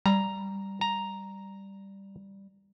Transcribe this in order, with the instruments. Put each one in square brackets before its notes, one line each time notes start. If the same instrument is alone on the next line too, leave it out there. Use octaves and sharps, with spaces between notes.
[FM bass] G3 [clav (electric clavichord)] A#5
[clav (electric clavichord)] A#5